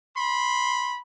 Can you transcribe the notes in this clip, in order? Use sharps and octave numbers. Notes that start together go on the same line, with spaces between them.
B5 C6